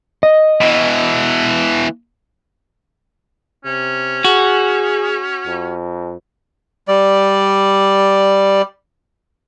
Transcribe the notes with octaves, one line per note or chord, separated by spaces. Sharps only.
D#5
B2 E3
C3 C#4
F#4 G#4
F2
G3 D5